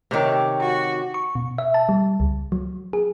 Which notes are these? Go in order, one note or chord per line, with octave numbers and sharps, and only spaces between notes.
C3 D#3 G4 C#5 D6
F#4
C#6
B2
E5
A5
G3
C#2
F#3
G#4